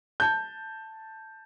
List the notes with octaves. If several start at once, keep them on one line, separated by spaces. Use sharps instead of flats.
A5 G6